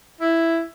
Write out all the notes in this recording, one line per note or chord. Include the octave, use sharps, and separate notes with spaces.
E4